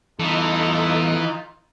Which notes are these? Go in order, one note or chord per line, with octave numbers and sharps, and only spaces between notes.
E2 E3 D#4 F4 A4